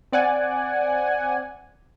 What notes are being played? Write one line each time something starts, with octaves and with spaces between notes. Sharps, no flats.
C4 D5 F#5 G#5